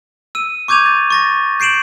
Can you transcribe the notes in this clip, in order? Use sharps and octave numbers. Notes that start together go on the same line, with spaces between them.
E6 D#7
C#6 D6 G6 G#6 D#7 F7
A6
C#6 A6 A#6
G6 C7 D7 E7 F#7